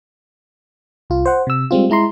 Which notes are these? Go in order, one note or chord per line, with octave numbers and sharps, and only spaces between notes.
C2 F4
C5 F#5
C3 E6
G3 G#3 C4 F4
G#3 E4 A#5 C6